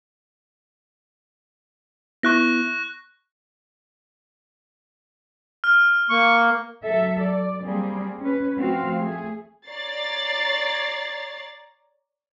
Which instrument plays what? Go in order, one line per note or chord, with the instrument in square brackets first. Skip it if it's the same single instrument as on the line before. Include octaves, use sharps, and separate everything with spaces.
[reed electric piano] B3 E4 [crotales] C#6 F#6 A#6
[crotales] F6
[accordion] A#3 [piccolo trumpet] C#6
[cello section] F#3 A4 E5
D5
G3 A#3 C4 G#4
C#4 B4
F3 A3 C4 F#4 F5
A3 G#4
[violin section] C#5 D5 A#5 A6 C7